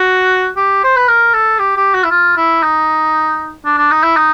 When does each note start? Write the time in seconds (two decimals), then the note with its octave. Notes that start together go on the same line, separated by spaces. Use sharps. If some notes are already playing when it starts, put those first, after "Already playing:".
Already playing: F#4
0.57 G4
0.84 C5
0.96 B4
1.08 A#4
1.34 A4
1.59 G4
1.77 G4
1.94 F#4
2.04 E4
2.11 F4
2.37 E4
2.63 D#4
3.65 D4
3.78 D4
3.91 D#4
4.03 E4
4.17 D#4